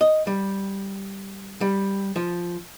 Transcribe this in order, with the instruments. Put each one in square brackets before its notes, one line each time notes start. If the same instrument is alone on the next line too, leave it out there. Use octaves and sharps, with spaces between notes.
[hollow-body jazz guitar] D#5
G3
G3
F3